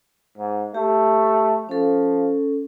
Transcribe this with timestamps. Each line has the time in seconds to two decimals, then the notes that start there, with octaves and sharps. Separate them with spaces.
0.38 G#2
0.74 A3 G4
1.69 F3 C#4 A4